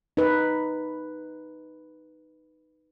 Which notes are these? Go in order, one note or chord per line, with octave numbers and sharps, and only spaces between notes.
D#4 B4